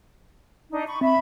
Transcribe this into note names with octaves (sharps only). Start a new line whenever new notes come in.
D4 D#4
B5 C#6
C4 E5 B5